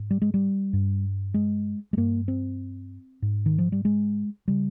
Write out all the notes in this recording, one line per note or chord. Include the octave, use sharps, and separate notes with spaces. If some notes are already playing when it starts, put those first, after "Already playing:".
Already playing: G#2
G3
G#3
G3
G2
G#3
G#3
G2 A#3
C4
G#2
D#3
F3
G3
G#3
C#3 G3